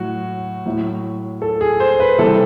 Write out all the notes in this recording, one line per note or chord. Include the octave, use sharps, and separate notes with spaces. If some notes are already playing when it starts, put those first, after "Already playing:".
Already playing: A2 F#3 F#4
A2 F#3
A4
G#4
C5
B4
C3 E3 G3 A4